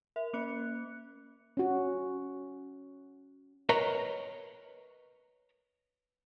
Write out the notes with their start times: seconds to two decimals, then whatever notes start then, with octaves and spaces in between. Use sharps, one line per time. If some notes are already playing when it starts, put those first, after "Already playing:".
0.16 A#4 E5
0.33 A#3 C#4 F#6 C#7
1.57 C#4 F#4
3.69 A#4 B4 C#5 D#5 A#5